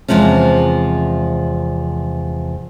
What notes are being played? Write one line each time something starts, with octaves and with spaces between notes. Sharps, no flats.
E2 C3 F3 G#3 C#4